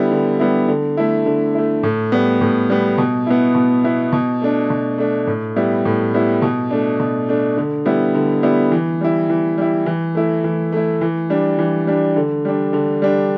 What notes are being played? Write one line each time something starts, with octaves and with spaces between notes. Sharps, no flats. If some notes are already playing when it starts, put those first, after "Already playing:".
Already playing: D3 G3 B3 E4
D3
G3 B3 E4
D3
A3 E4
D3
A3 E4
A2
G3 B3
A2
G3 B3
B2
B3 E4
B2
B3 E4
B2
A3 D4
B2
A3 D4
A2
G3 B3 E4
A2
G3 B3 E4
B2
A3 D4
B2
A3 D4
D3
G3 B3 E4
D3
G3 B3 E4
E3
G3 E4
E3
G3 E4
E3
A3 E4
E3
A3 E4
E3
G3 D4
E3
G3 D4
D3
G3 D4
D3
G3 D4